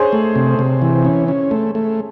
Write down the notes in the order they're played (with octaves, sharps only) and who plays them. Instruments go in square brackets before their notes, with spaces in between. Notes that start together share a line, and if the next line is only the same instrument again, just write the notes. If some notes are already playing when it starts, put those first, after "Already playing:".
Already playing: [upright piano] G#4 C5 C#5
[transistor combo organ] A3
C3
C3
E3
C#4
C#4
A3
A3